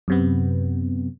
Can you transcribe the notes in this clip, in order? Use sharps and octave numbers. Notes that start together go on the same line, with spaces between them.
F#2 C3 B3